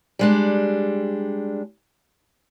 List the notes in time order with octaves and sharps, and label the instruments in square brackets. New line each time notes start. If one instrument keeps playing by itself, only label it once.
[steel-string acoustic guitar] G3 G#3 D4